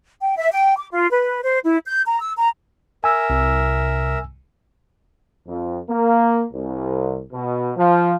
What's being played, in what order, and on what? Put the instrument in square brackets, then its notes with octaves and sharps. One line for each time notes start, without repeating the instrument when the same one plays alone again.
[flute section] G5
E5
G5
D6
F4
B4
C5
E4
G6
A#5
E6
A#5
[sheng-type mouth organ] A#4 E5 [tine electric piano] G#5 E6
[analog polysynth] C2
[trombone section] F2
A#3
C2
B2
F3